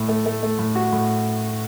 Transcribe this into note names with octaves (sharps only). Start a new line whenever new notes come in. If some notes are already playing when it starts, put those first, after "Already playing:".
Already playing: A2
A3
A3
A3
A2
F#4
A2